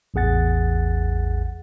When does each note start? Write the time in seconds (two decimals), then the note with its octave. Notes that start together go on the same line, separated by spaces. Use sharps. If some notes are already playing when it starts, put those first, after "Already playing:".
0.14 A1 E2 G#4 F#5 A6